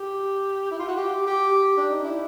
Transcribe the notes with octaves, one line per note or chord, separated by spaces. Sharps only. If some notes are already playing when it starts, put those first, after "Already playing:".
Already playing: G4
E4
F4
F#4
G4
G4
D4
D#4
E4